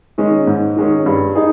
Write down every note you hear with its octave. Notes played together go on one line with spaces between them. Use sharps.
D#3 G#3 C#4
G#2
D#3 G#3 C#4
G2
D#4 G#4